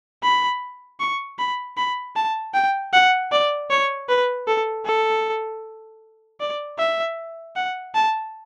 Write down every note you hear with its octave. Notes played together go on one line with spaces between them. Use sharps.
B5
C#6
B5
B5
A5
G5
F#5
D5
C#5
B4
A4
A4
D5
E5
F#5
A5